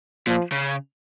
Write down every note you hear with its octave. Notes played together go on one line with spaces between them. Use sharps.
A#2 F3
C#3